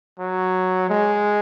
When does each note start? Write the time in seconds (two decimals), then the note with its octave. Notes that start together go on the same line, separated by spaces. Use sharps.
0.19 F#3
0.90 G#3